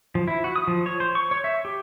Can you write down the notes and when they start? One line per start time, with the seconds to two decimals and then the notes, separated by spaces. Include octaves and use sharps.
0.15 F3
0.28 E4
0.44 F#4
0.56 D#6
0.68 F3
0.86 C#5
1.00 C5
1.15 C#6
1.31 C#5
1.44 E5
1.65 G4